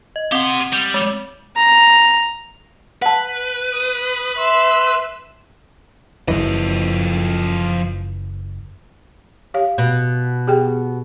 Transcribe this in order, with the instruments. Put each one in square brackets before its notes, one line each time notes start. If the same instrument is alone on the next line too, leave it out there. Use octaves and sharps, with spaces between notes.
[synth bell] D#5
[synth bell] C4 F#5 [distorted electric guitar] G4 C6
[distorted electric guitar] G3
[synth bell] G#3 D6
[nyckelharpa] A#5
[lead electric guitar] B4 [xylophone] F#5 A5
[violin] D#6
[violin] E5 E6 [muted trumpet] C6
[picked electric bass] F#1 F#2 E3 [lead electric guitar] F3 D#5
[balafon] G4 C#5 F5
[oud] B2
[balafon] G4 G#4 G5